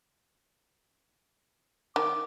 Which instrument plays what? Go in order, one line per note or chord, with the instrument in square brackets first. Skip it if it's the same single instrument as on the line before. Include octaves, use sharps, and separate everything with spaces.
[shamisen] D#3 [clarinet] D6